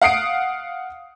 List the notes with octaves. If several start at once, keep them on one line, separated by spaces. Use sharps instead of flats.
F5 F#5 D#6 C7 D7